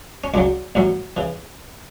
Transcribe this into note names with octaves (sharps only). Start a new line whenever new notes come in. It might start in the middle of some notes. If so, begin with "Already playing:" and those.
C#4
C#2 C#3 F#3 D4
A1 A2 F#3
C#3 E3